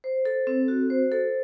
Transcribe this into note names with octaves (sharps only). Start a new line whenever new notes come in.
C5
A4
C4
F#4
C5
A4